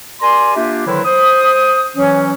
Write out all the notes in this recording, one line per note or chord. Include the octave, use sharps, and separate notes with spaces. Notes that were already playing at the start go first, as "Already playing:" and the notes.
G4 A#4 D5 G#5 A#5 C6
A#3 D4 F4 G4 E5
D3 D#3 F#3 E4 B4 C5
C5 D#6
E3 F#3 C#4